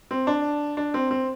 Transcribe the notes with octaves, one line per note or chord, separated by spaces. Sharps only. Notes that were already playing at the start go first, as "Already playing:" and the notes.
C4
D4
D4
C4
C4